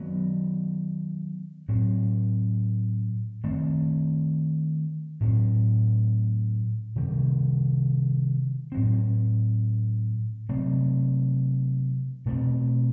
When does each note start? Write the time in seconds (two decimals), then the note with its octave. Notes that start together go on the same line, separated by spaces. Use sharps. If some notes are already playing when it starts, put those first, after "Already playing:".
Already playing: D#3 F#3 B3
1.68 A2 F#3 C4
3.44 D#3 A3 C4
5.20 A2 F#3 C4
6.96 C3 D#3 G3
8.72 A2 F#3 C4
10.49 C3 F#3 A3 C4
12.25 B2 A3 C4